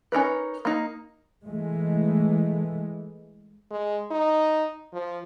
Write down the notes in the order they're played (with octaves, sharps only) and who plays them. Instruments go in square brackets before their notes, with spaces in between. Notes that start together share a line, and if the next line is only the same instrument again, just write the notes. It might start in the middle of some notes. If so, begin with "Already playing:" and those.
[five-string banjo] C#4 D#4 A#4 B4
A#3 D#4
[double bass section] E3 G#3 A3
[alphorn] G#3
D#4
F3